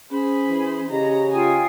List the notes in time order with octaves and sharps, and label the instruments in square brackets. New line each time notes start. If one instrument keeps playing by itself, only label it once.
[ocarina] C#4 [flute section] G#4 B5 [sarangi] C5
[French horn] E3
[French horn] C#3 [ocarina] G4 [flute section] C#5 D#5 [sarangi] A#5
[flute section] F4 G5 D#6 [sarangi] G#5